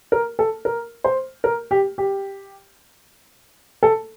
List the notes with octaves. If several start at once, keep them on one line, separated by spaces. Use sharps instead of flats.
A#4
A4
A#4
C5
A#4
G4
G4
A4